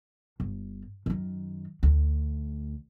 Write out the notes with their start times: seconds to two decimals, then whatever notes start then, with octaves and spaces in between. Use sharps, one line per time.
0.40 G1
1.06 F#2 D#3
1.83 D2